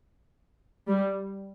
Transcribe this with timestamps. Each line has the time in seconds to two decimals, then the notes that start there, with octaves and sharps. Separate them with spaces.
0.88 G3